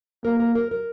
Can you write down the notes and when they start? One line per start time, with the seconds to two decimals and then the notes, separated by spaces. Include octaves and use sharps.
0.24 A#3 A#4
0.40 A#4
0.55 A#4
0.71 A#4